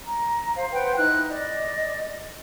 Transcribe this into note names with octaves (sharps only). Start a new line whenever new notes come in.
A#5
C5 F5
B4 C5 F#5 G5
D#4 E4 F#6
D5 D#5